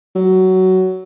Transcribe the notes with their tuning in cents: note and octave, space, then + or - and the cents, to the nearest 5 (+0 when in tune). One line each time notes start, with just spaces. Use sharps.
F#3 +15